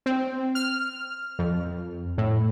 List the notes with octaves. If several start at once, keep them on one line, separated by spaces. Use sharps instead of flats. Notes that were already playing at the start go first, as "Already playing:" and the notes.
C4
F6
F2
A2